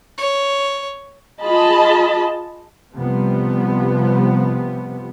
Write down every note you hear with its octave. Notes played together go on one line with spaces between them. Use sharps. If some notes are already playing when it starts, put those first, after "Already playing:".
C#5
F4 G#4 D#5 A5 B5
C3 F3 G3 B3